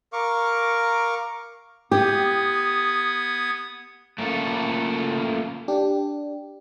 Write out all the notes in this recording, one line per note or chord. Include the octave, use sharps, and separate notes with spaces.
A#4 F5 C#6 D6
B3 G4 D#6 G#6
A3 A#3 C#4 F4 A4
D4 G4